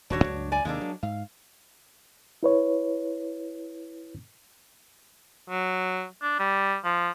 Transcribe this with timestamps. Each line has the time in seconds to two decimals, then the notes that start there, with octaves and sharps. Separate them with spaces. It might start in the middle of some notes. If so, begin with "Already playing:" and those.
0.10 D#1 D#2 D4 F#4 C#5
0.23 C#2 G2 F#3
0.52 D5 G#5
0.65 D#2 C3 D#3 G#3 A#3 D4
0.81 F#3
1.03 G#2 F5
2.43 E4 B4 C#5
5.50 F#3
6.22 D4
6.39 G3
6.84 F3